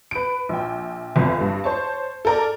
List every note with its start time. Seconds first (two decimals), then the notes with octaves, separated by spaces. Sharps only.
0.11 B4 D7
0.49 A#1 G5
1.16 G1 F2 F3
1.41 G2
1.64 C5 C#5 A5
2.25 A4 A#4 D5